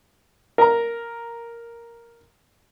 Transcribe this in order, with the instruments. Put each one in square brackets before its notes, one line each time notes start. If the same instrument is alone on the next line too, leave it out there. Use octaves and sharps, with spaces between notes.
[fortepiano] A#4 A#5